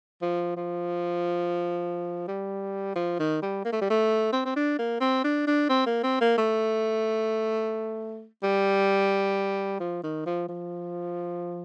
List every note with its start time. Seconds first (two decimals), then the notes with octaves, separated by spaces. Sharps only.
0.22 F3
0.56 F3
2.28 G3
2.95 F3
3.19 D#3
3.42 G3
3.64 A#3
3.72 A3
3.81 G3
3.90 A3
4.32 C4
4.45 C4
4.56 D4
4.79 A#3
5.00 C4
5.24 D4
5.47 D4
5.69 C4
5.86 A#3
6.03 C4
6.21 A#3
6.37 A3
8.43 G3
9.80 F3
10.03 D#3
10.26 F3
10.48 F3